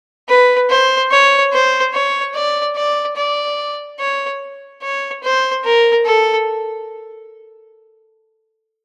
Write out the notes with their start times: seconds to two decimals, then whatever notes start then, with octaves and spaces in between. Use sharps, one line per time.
0.29 B4
0.70 C5
1.11 C#5
1.53 C5
1.94 C#5
2.34 D5
2.77 D5
3.17 D5
3.99 C#5
4.83 C#5
5.23 C5
5.65 A#4
6.06 A4